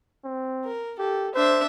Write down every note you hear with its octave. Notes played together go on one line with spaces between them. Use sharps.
C4
A#4
G4 A4
D4 C5 E5